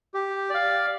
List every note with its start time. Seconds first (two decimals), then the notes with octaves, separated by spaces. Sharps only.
0.14 G4
0.50 D5 F5